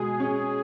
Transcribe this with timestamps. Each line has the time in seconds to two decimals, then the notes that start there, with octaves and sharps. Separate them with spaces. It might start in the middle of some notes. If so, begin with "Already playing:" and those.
Already playing: B2 G#3 G#4
0.20 C#4